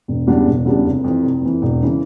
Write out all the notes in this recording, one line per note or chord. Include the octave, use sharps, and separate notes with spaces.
E1
E2 C#3 G3 D4
E1
E2 C#3 G3 D4
F1
F2 E3
F1
F2 E3
E1
C#3 E3